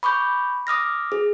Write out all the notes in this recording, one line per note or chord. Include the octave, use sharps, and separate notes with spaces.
B5 C#6 D6 G6
D6 D#6 F6 A#6
G#4